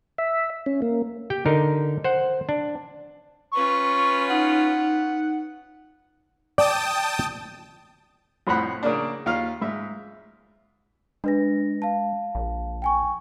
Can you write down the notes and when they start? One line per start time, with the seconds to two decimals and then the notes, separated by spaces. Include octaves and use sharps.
0.18 E5
0.66 C#4
0.82 A#3
1.30 G4 G5
1.46 D3 D#4 A#4
2.04 C5 F#5
2.49 D4
3.53 C#4 F4 B4 C#6
4.30 D#4 F#5
6.58 D5 G5 A5 D#6
8.47 C2 F2 A2 C5 F#5 B5
8.83 C#3 A#3 D4
9.26 D#2 F4 F5
9.61 G#2 E5
11.24 G#3 D4 B4 A#6
11.82 F5 A5
12.35 A#1
12.82 G5 G#5 C#6